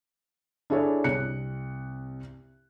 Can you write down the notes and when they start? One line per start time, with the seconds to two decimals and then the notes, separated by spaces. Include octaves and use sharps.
0.70 D4 E4 G#4 A4 C#5
1.04 C2 F#6 C#7